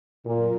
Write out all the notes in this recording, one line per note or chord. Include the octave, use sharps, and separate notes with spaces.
F#2 A#2 C#3 F#3